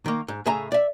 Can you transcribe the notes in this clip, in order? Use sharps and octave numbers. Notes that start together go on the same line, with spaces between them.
D#3 A#3
G#2
A2 C#3 G#4 E5 G#5 A#5
D5 E5